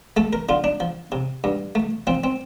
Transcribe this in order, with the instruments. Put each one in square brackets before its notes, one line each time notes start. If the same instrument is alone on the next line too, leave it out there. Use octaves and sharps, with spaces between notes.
[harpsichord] A3 A4
A#4
D3 F4
D4
F3
C3
G2
A3
F3 C4
C4